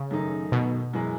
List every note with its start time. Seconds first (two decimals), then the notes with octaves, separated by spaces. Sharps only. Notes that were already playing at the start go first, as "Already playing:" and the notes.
Already playing: C#3
0.11 F#2 D#3 A3 D#4
0.52 B2
0.94 F#2 E3 G#3